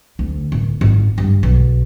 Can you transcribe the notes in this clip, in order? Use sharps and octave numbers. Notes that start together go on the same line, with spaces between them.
D2
D1
G#1
G2
B1